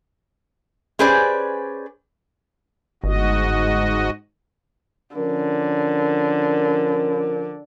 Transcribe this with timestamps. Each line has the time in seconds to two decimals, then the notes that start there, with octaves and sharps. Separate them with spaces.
0.99 C#4 G4 G#4 B4 C5 D5
3.04 G1 G#2 F#4 D#5
5.16 D3 F3 C#4 A#4